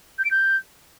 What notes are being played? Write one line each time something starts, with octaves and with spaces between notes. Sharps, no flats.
G6
D7
G6